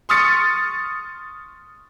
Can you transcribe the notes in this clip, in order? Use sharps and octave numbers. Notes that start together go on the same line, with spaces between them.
C6 C#6 D#6 F6 A6 C#7